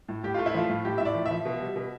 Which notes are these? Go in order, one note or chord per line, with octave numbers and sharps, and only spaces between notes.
A2
A2 G4
A3 F4
E4
F3 F4
A2
A2 G4
A2 E5
D5
F3
E5
F3
B2
G3
B2